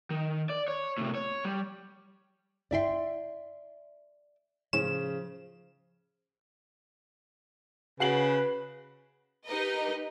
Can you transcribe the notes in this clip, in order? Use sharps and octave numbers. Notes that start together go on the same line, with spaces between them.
D#3
D5
C#5
A2 C3
C#5
G3
G1 E4 D5 E5 G5 C6
A2 C#3 F3 C#4 E7
C#3 F#4 B4 C7 F#7
D#4 G4 A#4 B4 D#5